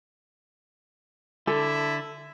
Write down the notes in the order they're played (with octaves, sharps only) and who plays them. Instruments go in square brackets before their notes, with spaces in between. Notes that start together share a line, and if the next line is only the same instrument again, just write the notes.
[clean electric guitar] D3 [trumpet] E4 [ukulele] A4